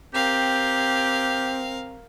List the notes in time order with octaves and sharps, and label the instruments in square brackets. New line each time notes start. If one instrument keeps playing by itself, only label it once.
[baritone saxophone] C4 [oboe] G4 [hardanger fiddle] A#4 F5